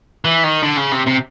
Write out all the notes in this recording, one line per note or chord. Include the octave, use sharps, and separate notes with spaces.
E3
D#3
D3
C#3
C3
C3